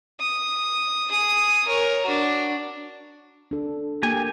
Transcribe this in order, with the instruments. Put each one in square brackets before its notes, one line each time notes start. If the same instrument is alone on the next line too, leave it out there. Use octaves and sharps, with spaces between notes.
[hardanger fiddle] D#6
G#4 D#6
A#4 C#5
D4 F#4
[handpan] D4 A4
[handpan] A#3 [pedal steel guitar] G4 G#5